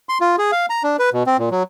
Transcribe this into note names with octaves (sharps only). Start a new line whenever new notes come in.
C6
F4
G#4
F5
A#5
D4
B4
B2
C4
A#2
F#3